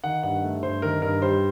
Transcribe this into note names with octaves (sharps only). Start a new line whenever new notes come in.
D#3 F#5
G2 F#5
A3
G2 C5
D#3 A#4
G2 A#4
G3 C5